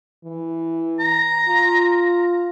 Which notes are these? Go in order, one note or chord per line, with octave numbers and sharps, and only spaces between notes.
E3
A#5
F4